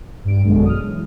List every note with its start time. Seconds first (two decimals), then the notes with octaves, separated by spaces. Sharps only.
0.25 G2 D7
0.44 A1 F#2 B2 D3 F#3 G#3
0.65 D#6 F6
0.88 E3